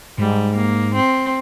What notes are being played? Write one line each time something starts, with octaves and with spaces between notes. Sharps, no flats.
G#2 G3
A#3
C4